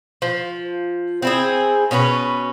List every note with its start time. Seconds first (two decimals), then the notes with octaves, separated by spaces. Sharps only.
0.22 F3
1.22 C4 E4 G#4
1.91 B2 C#4 G4 B4